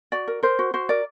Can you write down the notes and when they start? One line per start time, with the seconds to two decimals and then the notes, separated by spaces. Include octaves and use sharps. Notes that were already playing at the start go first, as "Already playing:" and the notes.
0.12 F#4 D5
0.28 A#4
0.43 A#4 C5
0.59 F#4
0.74 F#4 C5
0.89 A#4 D5